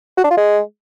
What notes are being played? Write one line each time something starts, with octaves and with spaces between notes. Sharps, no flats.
F#4
D4
F4
G#3